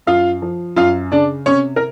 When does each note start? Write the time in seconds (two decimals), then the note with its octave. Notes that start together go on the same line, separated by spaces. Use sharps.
0.07 F#2 F4 F5
0.42 F3
0.76 F#2 F4 F5
1.12 C#3 D4 D5
1.46 C3 C#4 C#5
1.76 A#4